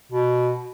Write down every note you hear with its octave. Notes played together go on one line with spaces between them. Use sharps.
B2